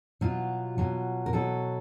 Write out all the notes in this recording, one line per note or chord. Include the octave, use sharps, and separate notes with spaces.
B2 F#3 F4
B2 F#3
A#4
B2 F#3 A4